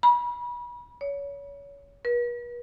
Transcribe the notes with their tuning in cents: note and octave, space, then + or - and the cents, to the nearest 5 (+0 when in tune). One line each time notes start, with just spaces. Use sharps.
B5 -35
C#5 +25
B4 -45